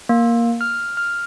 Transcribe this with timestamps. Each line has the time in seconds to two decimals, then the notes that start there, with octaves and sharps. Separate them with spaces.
0.09 A#3
0.61 F6
0.97 F6